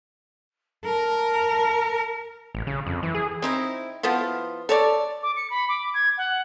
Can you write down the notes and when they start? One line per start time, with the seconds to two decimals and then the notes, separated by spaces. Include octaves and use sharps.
0.85 A#4 A5
2.55 A1
2.67 C#3
2.87 F2
3.03 E3
3.15 G#4
3.42 C4 D#4 E4
4.03 F3 B3 E4 F4
4.69 A4 C#5 D5
5.23 D6
5.37 C#7
5.50 B5
5.69 D6
5.94 G#6
6.18 F#5